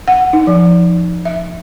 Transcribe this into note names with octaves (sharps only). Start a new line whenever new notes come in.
F#5
D#4
F3
E5